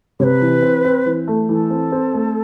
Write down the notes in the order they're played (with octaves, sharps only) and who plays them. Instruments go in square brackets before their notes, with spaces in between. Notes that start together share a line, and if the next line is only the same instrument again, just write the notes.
[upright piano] C3 [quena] C#5
[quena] B4
[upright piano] E3
C4
C4
E3
A3
[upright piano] E3 [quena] A4
[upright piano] C4
C4
A3